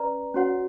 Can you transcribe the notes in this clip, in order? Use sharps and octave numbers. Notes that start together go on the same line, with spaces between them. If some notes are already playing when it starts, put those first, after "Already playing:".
Already playing: C#4 B4 D5 A#5
C#4 F#4 C#5 F#5